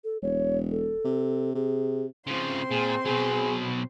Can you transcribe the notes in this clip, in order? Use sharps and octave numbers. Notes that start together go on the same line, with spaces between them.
A4
E1 C#5
A4
C3
C3 G#4
C#3 F3 C4 C6
A#2 G#4
B2 F#3 G#4